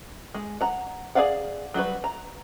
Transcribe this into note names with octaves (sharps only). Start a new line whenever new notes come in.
G#3
F#5 A#5
G#4 B4 D5 F5 F#5
F#3 G3 F#4 B4
A#5